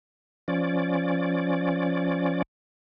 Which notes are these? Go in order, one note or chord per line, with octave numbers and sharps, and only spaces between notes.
F3 C#4 D5